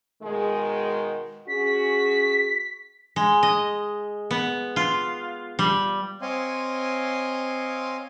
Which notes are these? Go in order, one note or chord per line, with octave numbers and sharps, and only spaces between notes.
B2 D#3 G#3
C#4 F#4 G#4 B6
G#3
D#5
B3
F4
G3
C4 C#5 D#5 F5 G#5 C6